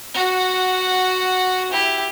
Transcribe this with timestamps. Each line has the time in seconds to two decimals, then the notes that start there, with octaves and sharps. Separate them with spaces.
0.14 F#4 F#5
1.71 E4 G4